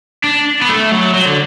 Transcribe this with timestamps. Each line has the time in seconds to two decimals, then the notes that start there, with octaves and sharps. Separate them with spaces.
0.24 D4
0.62 B3
0.69 A3
0.92 F#3
1.14 F#3
1.26 D3